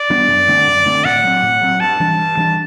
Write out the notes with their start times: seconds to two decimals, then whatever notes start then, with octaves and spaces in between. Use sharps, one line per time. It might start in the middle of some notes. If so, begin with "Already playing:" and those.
Already playing: D5
0.10 G3 B3 D4
0.28 F#2
0.48 D3 A3 C4
0.67 F#2
0.85 D3 A3 C4
1.05 A2 F#5
1.24 F#3 C4
1.43 A2
1.62 F#3 C4
1.80 G2 A5
2.00 E3 G3 D4
2.18 G2
2.37 E3 G3 D4